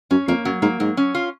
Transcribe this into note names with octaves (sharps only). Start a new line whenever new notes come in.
F#2 C#4
F2 A#3
F#2 F#3
G#2 A#3
G#2 F#3
C#4
F4